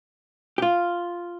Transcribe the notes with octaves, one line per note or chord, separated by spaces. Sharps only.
G4
F4